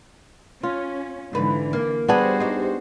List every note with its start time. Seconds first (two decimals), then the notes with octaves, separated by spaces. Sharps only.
0.63 C#4 F4
1.33 G#2 D3 E3 B4
1.73 A#3
2.08 G3 B3 D4 F#4 G#4 C5
2.40 D#4 G4